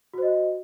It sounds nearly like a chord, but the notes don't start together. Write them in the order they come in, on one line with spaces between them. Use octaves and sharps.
F#4 C5 D#5